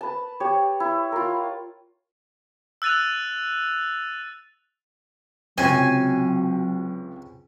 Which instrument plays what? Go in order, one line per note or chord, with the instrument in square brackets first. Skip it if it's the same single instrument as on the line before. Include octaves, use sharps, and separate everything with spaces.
[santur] B4 A5
G4 C#5
E4
F4 A#4
[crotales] E6 F#6 A6 D#7 F7
[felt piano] C#2 C3 [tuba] F#3 [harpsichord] C4 C#4 [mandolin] G#5